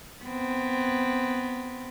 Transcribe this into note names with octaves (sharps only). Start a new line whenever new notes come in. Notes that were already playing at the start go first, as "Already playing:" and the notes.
B3 C4